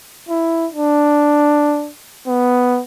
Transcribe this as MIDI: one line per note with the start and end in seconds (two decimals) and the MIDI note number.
0.29 0.68 64
0.73 1.90 62
2.28 2.81 59